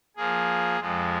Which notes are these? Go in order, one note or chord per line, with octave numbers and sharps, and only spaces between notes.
F3 A#3 G#4
F2 F3 G#3